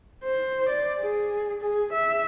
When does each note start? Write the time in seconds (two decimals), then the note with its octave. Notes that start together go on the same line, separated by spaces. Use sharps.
0.24 C5
0.69 D5
1.00 G#4
1.61 G#4
1.92 E5